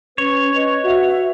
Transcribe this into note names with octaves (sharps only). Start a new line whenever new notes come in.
C#4 B4 C#5
B4 D#5
F#4 E5